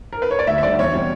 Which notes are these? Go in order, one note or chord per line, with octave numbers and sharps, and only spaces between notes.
A#4
B4
C#5
D5
D2 E5
E5
D3 G3 D5
E2 C#5
B2 G3 C#4 C#5